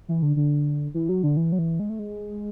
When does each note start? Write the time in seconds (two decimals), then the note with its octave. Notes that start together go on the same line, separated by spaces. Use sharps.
0.09 E3
0.22 D3
0.36 D3
0.94 E3
1.09 F#3
1.23 D3
1.37 E3
1.52 F#3
1.59 E3
1.79 G#3
1.90 A3
1.99 G#3